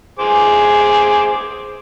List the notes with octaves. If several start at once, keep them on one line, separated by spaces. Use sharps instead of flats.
G#4 C5 D6